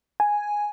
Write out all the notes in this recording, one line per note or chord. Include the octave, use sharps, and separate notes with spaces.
G#5